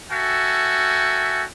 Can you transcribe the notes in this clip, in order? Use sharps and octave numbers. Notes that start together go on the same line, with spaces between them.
F#4 A4 E5 G5 G#5